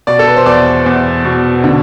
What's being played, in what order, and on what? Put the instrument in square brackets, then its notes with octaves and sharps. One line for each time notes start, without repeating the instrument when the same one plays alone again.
[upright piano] B2 D5
A4
B4
C5
E2 D5
E2
B2
D3